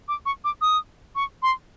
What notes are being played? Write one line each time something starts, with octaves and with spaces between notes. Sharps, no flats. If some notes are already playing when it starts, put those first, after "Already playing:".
D6
C#6
D6
D#6
C#6
C6